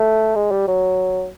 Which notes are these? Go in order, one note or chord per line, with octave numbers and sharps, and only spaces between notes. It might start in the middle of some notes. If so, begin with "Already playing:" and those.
Already playing: A3
G#3
G3
F#3